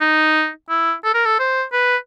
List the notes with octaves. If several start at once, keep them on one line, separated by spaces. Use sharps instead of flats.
D#4
E4
A4
A#4
A4
C5
B4